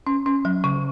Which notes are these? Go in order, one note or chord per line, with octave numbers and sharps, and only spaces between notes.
C#4
C#4
F#3
C#3